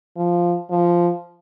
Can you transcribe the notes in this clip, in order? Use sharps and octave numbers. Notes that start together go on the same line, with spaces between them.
F3
F3